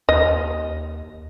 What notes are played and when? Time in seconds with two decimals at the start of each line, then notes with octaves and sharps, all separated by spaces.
0.09 D#2 D#5